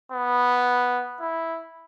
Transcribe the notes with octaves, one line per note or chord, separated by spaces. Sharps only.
B3
E4